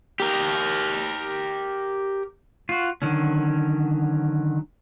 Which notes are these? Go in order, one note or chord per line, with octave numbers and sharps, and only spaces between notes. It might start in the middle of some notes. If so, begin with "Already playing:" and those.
G4 A#4
F4 F#4
D3 D#3 F#3 C#4